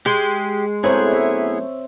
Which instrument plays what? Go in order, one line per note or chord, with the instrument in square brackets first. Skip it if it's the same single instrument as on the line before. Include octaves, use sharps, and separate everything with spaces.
[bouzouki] G#3 [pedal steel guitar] G4 G5
[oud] F#2 A3 [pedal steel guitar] B3 E4 G#4 [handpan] C4 C5 C#5
[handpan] E5